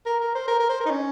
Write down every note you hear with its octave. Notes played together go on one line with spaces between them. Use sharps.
A#4
A#4
C5
A#4
A#4
C5
A#4
D#4
C#4